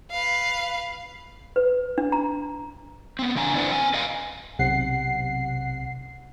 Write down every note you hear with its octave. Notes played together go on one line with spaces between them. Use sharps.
B4 F5
B4
D4
A#5
B3 C4
E2 C#3 D4 G#5 A#5
D4 E4 B4 C5 F#5
C4 G#5
B4 D#5 F5 G#5
B1 C3 F#5 C7